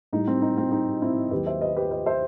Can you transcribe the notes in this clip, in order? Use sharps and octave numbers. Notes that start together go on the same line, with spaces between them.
A2 G3 D#4
C4
D#4
C4
D#4
C4 E4
D#2 D#3 F#3 G4 B4
C5 E5
B4 D#5
G4 B4
B4 D#5
C5 E5